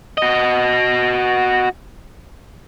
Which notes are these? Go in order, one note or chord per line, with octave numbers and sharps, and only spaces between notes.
F#4 D#5